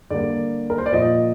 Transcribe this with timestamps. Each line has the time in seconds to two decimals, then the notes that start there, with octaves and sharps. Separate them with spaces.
0.10 D3 G3 A#3 D5
0.70 A#4
0.78 C5
0.86 D5
0.92 A#2 F3 A#3 D#5